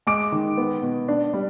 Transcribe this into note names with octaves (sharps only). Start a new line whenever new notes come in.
G#3 D6 D7
D#3
B3
B2
D4
G3